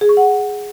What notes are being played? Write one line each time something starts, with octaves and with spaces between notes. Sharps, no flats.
G#4
C#6
F#5